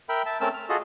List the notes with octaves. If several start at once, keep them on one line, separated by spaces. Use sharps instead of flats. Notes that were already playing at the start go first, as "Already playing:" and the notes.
A#4 E5 G5 B5
E5 A5
A3 C4 C#4 A#4 A5 E6
F6
F4 F#4 G#4 A4 D#5